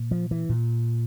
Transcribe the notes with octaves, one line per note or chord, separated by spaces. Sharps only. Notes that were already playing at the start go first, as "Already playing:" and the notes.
Already playing: A#2
F3
E3
A#2